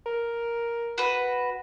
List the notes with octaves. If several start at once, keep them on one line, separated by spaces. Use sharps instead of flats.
A#4
F#4 B4